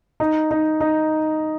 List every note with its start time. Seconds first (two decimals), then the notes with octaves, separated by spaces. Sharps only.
0.20 D#4
0.51 D#4
0.80 D#4